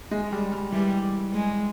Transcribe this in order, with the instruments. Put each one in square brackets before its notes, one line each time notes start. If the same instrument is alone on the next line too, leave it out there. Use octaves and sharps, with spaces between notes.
[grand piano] G#3
G3
G3
[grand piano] E3 [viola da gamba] G3
[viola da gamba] G#3